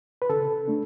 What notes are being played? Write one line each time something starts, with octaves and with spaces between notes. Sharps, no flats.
B4
C#3 A4
A3 D4